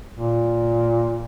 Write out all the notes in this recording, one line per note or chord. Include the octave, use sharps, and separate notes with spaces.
A#2